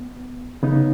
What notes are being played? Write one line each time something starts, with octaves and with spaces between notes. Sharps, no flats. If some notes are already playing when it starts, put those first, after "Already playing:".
Already playing: B3
C#3 B3 D#4